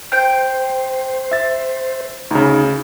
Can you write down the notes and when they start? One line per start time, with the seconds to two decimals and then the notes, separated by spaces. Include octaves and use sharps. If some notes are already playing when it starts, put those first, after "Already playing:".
0.12 C5 G5
1.31 E5 A6
2.31 D2 C#3 D#4